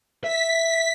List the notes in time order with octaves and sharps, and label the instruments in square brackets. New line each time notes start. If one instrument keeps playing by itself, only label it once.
[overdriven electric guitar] E5 [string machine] B6